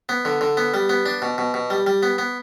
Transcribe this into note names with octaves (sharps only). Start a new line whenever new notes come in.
B3
D3
D3
B3
G3
B3
D4
B2
B2
B2
G3
G3
B3
B3